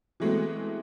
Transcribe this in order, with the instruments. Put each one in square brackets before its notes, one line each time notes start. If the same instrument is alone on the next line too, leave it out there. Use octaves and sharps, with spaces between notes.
[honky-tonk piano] E3 F#3 G#3 A3 B3 C4